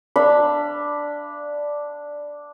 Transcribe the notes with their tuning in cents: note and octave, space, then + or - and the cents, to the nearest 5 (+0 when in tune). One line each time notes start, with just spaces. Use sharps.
D4 +0 F5 -45 B5 +0